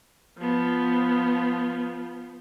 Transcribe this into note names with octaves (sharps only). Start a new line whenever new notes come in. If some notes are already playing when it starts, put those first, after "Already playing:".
F3 B3